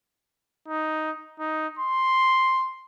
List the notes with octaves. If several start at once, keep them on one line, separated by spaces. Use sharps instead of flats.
D#4
D#4
C6